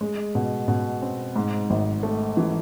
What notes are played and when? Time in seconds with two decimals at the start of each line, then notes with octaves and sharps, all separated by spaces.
0.01 G#3
0.35 B2
0.68 B2
1.02 C4
1.36 G#2
1.70 G#1
2.03 A3
2.37 E3